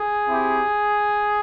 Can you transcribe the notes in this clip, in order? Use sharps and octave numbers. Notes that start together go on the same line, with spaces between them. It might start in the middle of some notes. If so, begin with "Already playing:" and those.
Already playing: G#4
C4 E4 G4